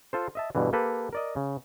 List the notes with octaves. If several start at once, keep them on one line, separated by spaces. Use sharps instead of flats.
F4 A4 C5
D#5 E5 A5
G2 B2 D3 E3
A#3 G4 A4 B4
A#4 D5 D#5
C#3